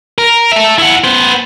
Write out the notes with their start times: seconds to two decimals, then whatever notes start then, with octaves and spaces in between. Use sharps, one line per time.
0.18 A#4
0.52 A4 E5
0.78 E4 F#5
1.04 B3 C5